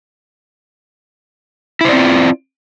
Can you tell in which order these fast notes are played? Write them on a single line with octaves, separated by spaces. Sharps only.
E4 C5 D5 C4 F4